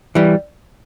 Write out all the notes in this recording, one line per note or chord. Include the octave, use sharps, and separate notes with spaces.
E3 G3